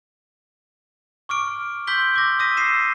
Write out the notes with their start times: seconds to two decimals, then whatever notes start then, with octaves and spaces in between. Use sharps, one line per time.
1.29 C#6 D6 F6 D7
1.87 C6 E6 G6 B6 G7
2.16 D6 A#6
2.39 D#6 E6 A#6 B6 D#7
2.57 D#6 C7 D#7 E7